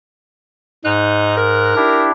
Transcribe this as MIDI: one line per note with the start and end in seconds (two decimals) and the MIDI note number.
0.84 1.74 44
0.84 1.33 63
0.84 1.74 90
1.37 2.06 70
1.76 2.11 62
1.76 2.11 64
1.76 2.11 67